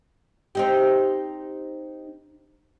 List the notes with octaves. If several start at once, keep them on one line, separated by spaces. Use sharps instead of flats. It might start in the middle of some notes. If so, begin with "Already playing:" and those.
C4 D#4 G4